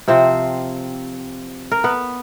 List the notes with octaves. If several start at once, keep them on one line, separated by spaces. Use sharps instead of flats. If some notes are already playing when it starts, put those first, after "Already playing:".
C3 F3 C4 C5
A#4
B3 B4